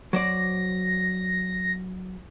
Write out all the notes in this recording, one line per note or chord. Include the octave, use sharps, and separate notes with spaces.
F#3 C5 D5 A#6